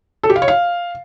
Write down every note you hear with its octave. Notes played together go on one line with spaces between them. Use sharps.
A4
G4
F5
C#5
F5